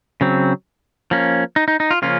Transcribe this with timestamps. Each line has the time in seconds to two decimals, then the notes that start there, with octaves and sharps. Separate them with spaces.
0.21 C#3 F#3 C4
1.11 F3 A#3 C#4
1.56 D#4
1.68 D#4
1.80 D#4
1.91 F4
2.02 C#3 F3 A#3 C#4 F4